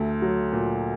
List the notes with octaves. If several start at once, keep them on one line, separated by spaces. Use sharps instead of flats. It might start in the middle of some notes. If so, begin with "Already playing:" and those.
Already playing: D2 A3
F#3
A#2